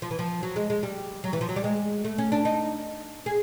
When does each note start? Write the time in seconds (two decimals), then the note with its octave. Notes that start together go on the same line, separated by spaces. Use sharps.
0.02 F3
0.11 E3
0.19 F3
0.43 F#3
0.56 G#3
0.70 G#3
0.83 G3
1.24 F#3
1.33 E3
1.41 F3
1.49 F#3
1.56 G3
1.64 G#3
2.05 A3
2.18 C#4
2.32 D4
2.45 D#4
3.26 G#4